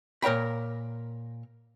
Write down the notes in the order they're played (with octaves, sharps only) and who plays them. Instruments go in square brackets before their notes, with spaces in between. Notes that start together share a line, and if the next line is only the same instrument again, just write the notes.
[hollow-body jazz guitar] A#2 A#4 C#5 G5 B5